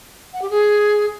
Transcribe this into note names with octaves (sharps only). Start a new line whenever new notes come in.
F#5
G4
G#4